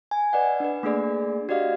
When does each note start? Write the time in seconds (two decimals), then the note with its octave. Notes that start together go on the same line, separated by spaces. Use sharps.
0.11 G#5
0.33 B4 D5 D#5 F#5
0.60 D4 B4
0.83 A3 A#3 D4 G#4 D5
1.49 F#4 G4 D5 D#5 F5